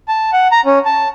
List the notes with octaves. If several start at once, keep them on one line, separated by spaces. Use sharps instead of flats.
A5
F#5
A#5
C#4
A5